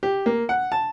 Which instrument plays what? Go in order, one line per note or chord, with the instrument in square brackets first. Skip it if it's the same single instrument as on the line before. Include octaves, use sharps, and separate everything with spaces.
[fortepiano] G4
A#3
F#5
A5